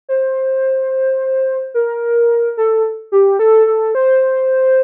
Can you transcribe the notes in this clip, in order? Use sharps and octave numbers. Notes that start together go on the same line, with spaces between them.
C5
A#4
A4
G4
A4
A4
C5